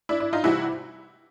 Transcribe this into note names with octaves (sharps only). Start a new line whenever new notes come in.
D4 E4
D4 E4
D#4 F4
C3 E3 G3 E4 F#4